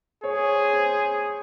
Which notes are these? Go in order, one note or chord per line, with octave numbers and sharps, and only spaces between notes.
G#4 C#5
C5
C5